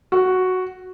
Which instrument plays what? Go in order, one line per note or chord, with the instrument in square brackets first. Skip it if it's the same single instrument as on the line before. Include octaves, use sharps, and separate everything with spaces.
[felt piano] F#4